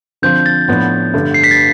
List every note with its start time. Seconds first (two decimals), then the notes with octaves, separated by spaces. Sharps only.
0.22 D3 F3 C4 F4 G6
0.46 A6
0.68 A2 F3 B3 D4
1.14 G2 D3 A3
1.34 C7
1.44 B6
1.51 A6